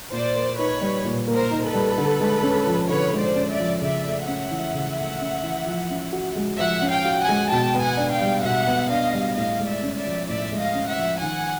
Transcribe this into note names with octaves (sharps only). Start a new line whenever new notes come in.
A#2 C5 D5
A#3
D#4 B4 C#5
G3
A#2
A#3
A#4 C5
D#4
A4 B4
G3
D3
G#3
C#4
F3
D3 B4 C#5
G#3
C5 D5
C#4
D5 E5
F3
C#3 D5 E5
A3
C#4 E5 F#5
E3
C#3
A3
C#4
E3
F3
C#4
F#4
G#3
F3 E5 F#5
C#4
F5 G5
F#4
F#5 G#5
G#3
B2 G5 A5
B3
F#5 G#5
D4
F5 G5
G3
B2 E5 F#5
B3
D4 D#5 F5
G3
A2 D#5 F5
G#3
D5 E5
C#4
D5 E5
F3
A2 D5 E5
G#3
D#5 F5
C#4
E5 F#5
F3
D#3 F#5 G#5